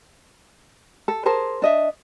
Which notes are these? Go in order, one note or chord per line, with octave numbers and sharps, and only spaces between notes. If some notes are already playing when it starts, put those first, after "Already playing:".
A4
G#4 A#4 C5 A5
D4 D#5 E5